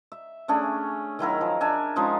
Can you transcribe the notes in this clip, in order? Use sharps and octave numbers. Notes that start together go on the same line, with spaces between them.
E5
A3 C#4 D4 G#4
D#3 F#3 E4 A#4
F3
D4 E5 G#5
F3 G#3 C#4 D#4